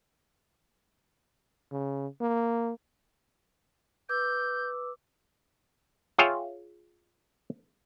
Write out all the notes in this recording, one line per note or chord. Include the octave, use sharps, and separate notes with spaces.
C#3
A#3
B4 D6 E6 G6
F4 G#4 C#5 E5 F5 G5